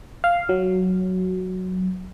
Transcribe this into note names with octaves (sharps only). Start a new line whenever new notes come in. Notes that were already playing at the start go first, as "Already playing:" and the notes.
F5
F#3